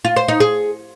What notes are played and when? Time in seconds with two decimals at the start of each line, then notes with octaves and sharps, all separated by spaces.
0.05 F4
0.16 C5
0.28 D#4
0.40 G#4